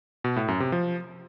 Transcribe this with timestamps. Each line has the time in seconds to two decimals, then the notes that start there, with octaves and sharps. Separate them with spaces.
0.24 B2
0.36 A2
0.48 F#2
0.60 C3
0.72 F3